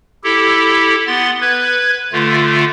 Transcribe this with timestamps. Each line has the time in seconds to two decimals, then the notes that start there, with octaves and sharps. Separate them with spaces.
0.24 E4 G4 A4
1.07 B3 C6 A6
1.41 B4 G#6
2.13 D3 A3 F4